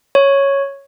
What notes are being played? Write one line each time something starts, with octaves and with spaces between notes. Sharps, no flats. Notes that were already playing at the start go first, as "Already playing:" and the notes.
C#5